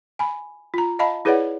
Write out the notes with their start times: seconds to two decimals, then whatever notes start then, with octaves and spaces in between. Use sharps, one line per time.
0.19 G#5 B5
0.74 F4 A#5
0.99 D#5 F5 A5 B5
1.25 E4 G#4 B4 C#5 D5 F#5